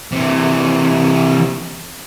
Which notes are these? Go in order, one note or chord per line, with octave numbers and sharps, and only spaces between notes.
C3 E3